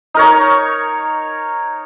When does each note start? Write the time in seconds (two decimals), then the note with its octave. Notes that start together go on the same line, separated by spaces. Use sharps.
0.14 D#4 A#4 C#5